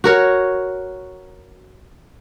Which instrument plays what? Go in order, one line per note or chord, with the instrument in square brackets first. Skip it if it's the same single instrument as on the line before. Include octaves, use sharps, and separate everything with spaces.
[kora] F#4 A#4 C#5